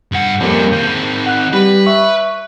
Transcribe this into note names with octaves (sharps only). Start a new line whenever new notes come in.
G2 F#5
F2 G3 A#3 C#4
D#3 C4 G6 D#7
F#5 F#6
G3 B4
E5 C#6